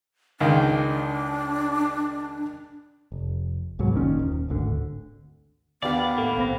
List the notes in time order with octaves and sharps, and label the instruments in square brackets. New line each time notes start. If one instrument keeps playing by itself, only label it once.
[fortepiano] C#2 D#3 F5 [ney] D4
[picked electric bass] F1
C2 G#2 B2 F#3
F#1 A#2 D#3 C#4
D#1
D1 G#1 D2 D3
[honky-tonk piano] D#2 G4 [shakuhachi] B3 [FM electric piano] D4 B4 F5 [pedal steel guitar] D5
[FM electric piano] A2 A3 [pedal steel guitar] A#3
[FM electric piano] B1 C4 A#6